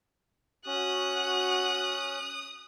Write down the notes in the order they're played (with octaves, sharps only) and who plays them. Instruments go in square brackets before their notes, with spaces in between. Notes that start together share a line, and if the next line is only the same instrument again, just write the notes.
[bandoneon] C#4 [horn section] F#4 [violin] D#6 [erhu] F#6